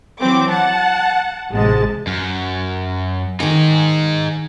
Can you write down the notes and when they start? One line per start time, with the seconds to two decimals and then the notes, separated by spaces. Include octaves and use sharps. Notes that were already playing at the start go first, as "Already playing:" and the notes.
0.19 E3 F#3 C4 D6
0.50 F#5 A5
1.53 A1 G#2 C3 G#3 A5
2.07 F#2
3.40 D#3 D#4 G#4 D6